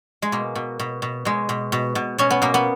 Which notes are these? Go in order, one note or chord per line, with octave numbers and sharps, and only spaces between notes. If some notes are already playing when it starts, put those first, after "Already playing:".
G#3
B2 A#3
B2
B2
B2
B2 G#3
B2
B2
B2
B2 C#4
B3
B2 A#3
B3